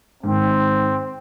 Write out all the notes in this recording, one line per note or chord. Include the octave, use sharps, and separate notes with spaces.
G#2 D#3 C4